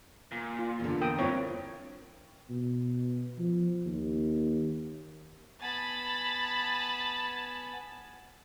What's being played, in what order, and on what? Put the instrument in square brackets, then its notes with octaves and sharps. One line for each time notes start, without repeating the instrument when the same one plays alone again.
[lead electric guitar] A#2
[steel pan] F4
[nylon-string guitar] E2 D3
[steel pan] A#4 G5 D#6
[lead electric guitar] G2 [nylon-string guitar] C4 E4 F4 [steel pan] C#5
[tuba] B2
F3
D#2
[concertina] B3 G#5 [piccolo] A5 [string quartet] B5 A6